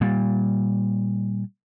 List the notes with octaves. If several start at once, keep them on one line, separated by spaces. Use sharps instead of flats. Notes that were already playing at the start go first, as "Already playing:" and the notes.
A#2 G3